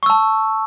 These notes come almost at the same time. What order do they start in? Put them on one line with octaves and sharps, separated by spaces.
C#6 E6 A5